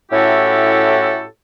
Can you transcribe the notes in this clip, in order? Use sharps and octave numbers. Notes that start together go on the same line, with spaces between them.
A2 C#4 E4 F#4 G4 A4